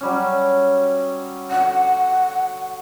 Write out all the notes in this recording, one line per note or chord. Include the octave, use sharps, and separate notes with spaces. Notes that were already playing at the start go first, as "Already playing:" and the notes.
F#3 G3 C#4
D3 F#4 F#5